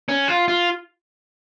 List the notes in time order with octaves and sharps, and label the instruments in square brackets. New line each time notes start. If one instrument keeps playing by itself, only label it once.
[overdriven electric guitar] C#4
F4
F4